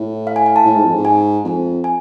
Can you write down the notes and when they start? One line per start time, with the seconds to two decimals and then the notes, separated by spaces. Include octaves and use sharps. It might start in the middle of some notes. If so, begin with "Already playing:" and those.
Already playing: A2
0.27 F5
0.36 G#5
0.46 G#5
0.56 A5
0.65 A2
0.76 G#2
0.85 F2
0.95 G#2
1.05 G#5
1.45 F2
1.84 G#5